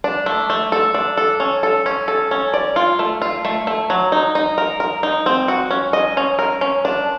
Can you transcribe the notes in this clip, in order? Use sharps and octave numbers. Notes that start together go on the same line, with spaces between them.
D4
A3
A3
A4
D4
A4
C#4
A4
C#4
A4
C#4
D5
F4
A3
F4
A3
A3
F#3
D#4
D#4
A#4
A#4
D#4
C4
F#4
C#4
D#5
C#4
A#4
C#4
D4